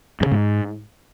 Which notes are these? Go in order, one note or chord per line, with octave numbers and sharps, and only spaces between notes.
G2
C#3
G#2